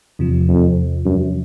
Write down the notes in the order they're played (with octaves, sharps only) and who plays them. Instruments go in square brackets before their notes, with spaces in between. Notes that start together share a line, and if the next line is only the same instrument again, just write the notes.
[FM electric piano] E2 C3 F3
[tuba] F2
F#2